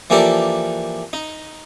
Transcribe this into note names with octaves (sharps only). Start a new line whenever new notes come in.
E3 F3 A#3 G4 A4 D5
D#4